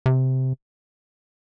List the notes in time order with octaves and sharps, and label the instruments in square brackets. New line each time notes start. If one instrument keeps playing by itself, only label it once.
[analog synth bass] C3